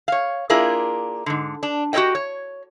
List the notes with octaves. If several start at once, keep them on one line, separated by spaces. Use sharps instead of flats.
C#5 F5
A#3 D4 E4 F4 G#4 A#4
G#2 D3
D4
F#4 G4 A4 C#5 D#5 G5
C#5